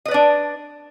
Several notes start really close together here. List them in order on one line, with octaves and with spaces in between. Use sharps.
D#5 B4 D5 D4